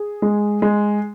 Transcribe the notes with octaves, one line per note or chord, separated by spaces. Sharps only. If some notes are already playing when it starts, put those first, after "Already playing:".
Already playing: G#4
G#3
G#3